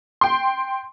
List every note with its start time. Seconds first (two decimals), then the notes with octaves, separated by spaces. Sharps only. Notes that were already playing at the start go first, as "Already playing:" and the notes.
0.21 G5 C6